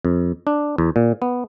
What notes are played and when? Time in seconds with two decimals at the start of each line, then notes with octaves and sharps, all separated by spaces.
0.05 F2
0.47 D4
0.78 E2
0.96 A#2
1.22 B3